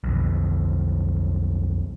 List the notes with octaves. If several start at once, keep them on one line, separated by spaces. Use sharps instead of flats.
B1 F2